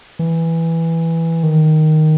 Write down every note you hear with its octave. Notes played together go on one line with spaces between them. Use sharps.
E3
D#3